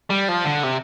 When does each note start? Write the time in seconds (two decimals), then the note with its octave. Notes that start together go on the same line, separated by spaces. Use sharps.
0.10 G3
0.28 F3
0.45 D3
0.63 C3